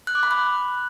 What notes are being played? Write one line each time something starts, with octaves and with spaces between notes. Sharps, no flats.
F#6
D6
B5
F#6